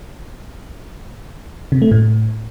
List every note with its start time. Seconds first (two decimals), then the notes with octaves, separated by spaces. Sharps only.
1.72 C3
1.82 A3
1.91 A2